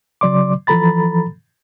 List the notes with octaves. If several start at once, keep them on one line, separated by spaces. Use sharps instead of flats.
C#3 F#3 D5 C6 D6
E3 F3 A4 A#5 B5 A6